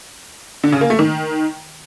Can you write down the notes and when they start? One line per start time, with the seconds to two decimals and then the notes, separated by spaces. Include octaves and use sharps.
0.64 D3
0.72 C#3
0.81 A#3
0.90 A3
0.99 D#3